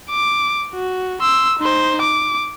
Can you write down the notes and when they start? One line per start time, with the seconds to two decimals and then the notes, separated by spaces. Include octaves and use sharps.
0.10 D6
0.75 F#4
1.21 C6 E6
1.59 D#4 C5
2.02 D6